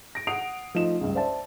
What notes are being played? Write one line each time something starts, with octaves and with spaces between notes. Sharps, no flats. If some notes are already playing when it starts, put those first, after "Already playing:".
A#6 D7
F#5 D#6 C7 D7 F7
F3 A3 D#4 E7
C#2 G2
C5 D5 E5 A5